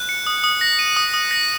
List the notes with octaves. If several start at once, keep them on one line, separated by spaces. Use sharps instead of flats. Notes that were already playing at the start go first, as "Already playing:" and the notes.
Already playing: F#6
C#7
D#6
D#6
A#6
D#7
D#6
D#6
A#6